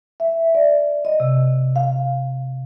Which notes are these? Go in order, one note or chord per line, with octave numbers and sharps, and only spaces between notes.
E5
D5
D#5
C3
F5